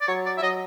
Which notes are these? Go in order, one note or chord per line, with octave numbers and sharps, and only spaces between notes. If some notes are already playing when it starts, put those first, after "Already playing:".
D5
F#3 C#5
D5
E5
F#3 D#5